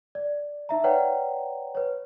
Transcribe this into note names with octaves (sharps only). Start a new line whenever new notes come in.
D5
D#4 E5 A#5
B4 C#5 D5 F#5 G5 A#5
B4 C#5